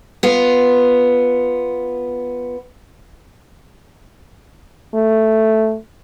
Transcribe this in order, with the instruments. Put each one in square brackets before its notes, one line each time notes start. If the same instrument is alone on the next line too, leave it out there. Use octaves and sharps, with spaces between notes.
[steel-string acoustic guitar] B3 F4
[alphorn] A3